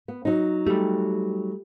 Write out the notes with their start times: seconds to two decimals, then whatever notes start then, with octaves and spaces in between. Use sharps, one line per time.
0.08 B3
0.25 F#3 D#4
0.67 G3 A3 G4